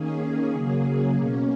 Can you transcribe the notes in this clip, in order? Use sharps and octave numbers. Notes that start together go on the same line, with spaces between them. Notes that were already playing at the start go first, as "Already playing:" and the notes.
Already playing: D#3 A#3 C#4 G#4
C#3 F#3 A#3 G#4
B2 A#3 C#4